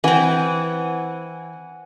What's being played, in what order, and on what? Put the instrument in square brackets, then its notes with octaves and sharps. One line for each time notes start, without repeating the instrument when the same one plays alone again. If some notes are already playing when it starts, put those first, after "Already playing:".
[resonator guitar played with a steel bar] E3 C4 [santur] F#5 G#5